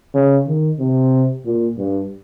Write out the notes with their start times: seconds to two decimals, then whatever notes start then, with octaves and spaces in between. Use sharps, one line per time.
0.14 C#3
0.47 D#3
0.79 C3
1.45 A#2
1.78 G2